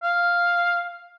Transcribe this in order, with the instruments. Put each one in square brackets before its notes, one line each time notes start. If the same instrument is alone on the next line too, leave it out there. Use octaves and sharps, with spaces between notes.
[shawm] F5